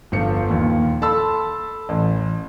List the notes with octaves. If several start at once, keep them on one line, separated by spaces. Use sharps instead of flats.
G1 F3 C#7
D#2 A#2
A4 A5 B5 C6 E6
A1